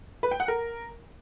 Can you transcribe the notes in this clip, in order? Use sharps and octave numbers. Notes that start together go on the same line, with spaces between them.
B4
G5
F#5
A#4